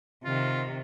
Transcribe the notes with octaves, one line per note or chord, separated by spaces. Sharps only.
C3 D#3 F4